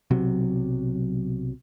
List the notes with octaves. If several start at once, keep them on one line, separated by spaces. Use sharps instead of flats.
B1 C3 F#3